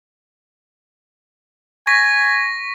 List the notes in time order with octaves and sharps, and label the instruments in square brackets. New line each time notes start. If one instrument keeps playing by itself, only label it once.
[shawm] G#5 [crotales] C#6 A#6 B6